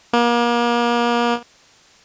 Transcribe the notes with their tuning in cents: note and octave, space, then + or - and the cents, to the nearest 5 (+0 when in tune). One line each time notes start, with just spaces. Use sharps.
A#3 +35